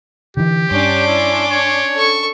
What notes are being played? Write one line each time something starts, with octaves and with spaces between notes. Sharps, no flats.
D3 E3 G4
G2 C#4 D4 C6 D6
E4
C#5
A4 C#6